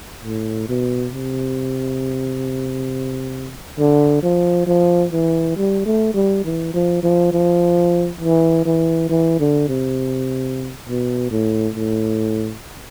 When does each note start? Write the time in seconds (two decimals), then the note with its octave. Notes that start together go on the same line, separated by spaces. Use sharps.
0.25 A2
0.69 B2
1.13 C3
3.79 D3
4.23 F3
4.67 F3
5.12 E3
5.56 G3
5.86 A3
6.14 G3
6.44 E3
6.74 F3
7.03 F3
7.32 F3
8.21 E3
8.65 E3
9.09 E3
9.40 D3
9.69 C3
10.87 B2
11.31 A2
11.75 A2